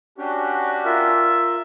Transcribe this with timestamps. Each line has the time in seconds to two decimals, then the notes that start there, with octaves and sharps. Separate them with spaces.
0.18 C#4 D4 F#4 G4
0.85 F4 A#4 E5